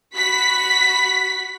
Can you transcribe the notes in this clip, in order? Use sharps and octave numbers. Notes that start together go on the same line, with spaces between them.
F#4 B5 B6